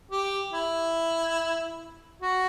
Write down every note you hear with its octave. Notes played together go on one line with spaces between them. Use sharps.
G4
E4
F#4